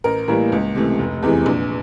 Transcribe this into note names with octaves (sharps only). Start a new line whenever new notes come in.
A1 A#4
A2 E3 G3 A#3 A#4
C#2
C3 E3 A3
F1
E2 C3 E3 G#3
A#1